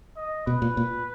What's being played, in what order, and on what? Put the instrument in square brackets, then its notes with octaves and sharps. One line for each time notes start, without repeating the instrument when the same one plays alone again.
[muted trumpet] D#5
[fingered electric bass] B2 [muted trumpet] B4
[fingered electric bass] A#2
A#2